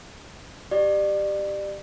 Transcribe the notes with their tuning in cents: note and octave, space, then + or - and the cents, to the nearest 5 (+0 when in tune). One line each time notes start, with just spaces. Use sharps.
G4 +0 D5 +30